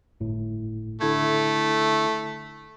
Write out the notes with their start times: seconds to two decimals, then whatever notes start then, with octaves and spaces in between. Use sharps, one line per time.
0.20 G1 A2
1.01 D3 A3 E4 G#6